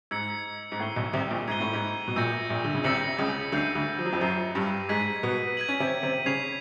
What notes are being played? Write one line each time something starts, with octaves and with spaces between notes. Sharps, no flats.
G#2 E6 G#6 C#7 F#7
G#2
A2 G#6 C7 D#7 G7
B1 B2
C2 C3
A#1 A#2
G#2 G#6 C7 D#7 G7
A2
G#2
B2
A#1 A#2 E6 G6 A#6 C#7 F#7
A#1 A#2
D3
C#3
C2 C3 E6 G6 A#6 C#7 F#7
C#2 C#3
D2 D3 G6 C7 D#7
D2 D3
F3
F#3
F2 F3
F#2 F#3 G6 C7 D#7
G2 G3
G#2 G#3 G#6 B6 D#7 F#7
B2 B3
G#6 B6 D#7 F#7
C#4
C3 C4
C3 C4
C#3 C#4 G#6 C7 F7